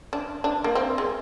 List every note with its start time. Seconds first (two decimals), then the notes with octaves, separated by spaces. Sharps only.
0.13 D4
0.44 D4
0.64 A#3
0.75 C4
0.98 G#3